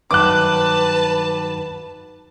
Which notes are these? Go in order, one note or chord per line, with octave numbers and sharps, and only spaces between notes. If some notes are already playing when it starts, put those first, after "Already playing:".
G2 D#3 F#3 B4 A5 D6 F#6